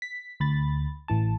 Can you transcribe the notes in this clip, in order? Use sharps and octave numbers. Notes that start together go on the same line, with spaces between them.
B6
D2 B5 A6
A1 E3 A5